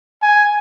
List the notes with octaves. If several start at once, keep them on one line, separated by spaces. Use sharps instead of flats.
G#5